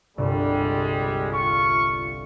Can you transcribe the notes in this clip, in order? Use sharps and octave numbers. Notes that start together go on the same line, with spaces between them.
G1 C2 G3 G#3
F4 C#6